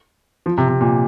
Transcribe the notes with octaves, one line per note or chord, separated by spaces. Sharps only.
F3
C3
C3
A#2